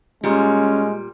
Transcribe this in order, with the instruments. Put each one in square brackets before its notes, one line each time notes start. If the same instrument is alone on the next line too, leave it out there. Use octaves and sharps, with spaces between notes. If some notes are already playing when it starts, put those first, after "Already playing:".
[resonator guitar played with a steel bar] A#2 G3 [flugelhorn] G#3 [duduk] C#4